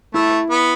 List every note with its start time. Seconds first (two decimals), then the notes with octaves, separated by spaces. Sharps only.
0.14 A3 E4
0.50 B3